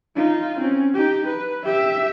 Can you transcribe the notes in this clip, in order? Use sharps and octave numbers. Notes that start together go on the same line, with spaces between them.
D#4 F4
C4 C#4
D#4 G4
B4
G4 E5